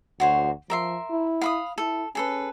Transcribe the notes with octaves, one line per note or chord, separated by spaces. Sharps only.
D2 F#4 C5 C#5
F3 A#4 E5 C6
E4
F5 B5 D#6
E4 A4
C#4 G#4 A4 B4